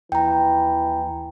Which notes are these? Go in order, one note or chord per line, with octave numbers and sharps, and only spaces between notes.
D#2 E3 G5 A#5